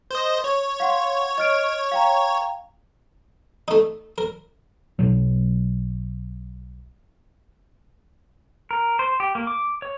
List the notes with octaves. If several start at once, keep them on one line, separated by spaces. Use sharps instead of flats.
C5 D#5
C#5
F5 F#5 C6
D#5 F6 D7
F5 G5 A#5
A3 D#4
A#4
B1 B2 F#3
A#4
C5
G4
A#3
D6
C#5